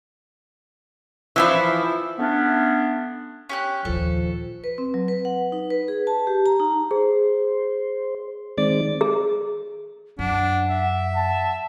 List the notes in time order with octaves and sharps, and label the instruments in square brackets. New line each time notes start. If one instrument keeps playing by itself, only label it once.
[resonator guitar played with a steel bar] E3 F3 E4
[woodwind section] A3 B3 C#4 D4
[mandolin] C#4 G4 F#6
[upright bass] A#1 D#2 [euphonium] F3 [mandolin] A4
[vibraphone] B4
C4
F#3
B4
F#5
D#4
B4
G#4
A5
G4
A#5
D#4
[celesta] G#4 [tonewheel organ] C5
[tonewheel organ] D#3 G#3 C4 [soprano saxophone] D5
[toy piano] G#4
[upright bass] F#2 [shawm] D4 [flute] F#5
[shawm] E5
[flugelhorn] A5